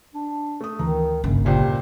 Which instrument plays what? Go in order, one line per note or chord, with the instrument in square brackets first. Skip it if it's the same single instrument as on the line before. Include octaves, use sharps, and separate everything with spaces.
[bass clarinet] D4
[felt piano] A3 D#6
[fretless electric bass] D2 E3 [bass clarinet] D#3 [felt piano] A#5
[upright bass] G1 [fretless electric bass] C2 C#3 A#3 [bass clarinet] F#2
[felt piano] C#2 A#2 C5 [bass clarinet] G4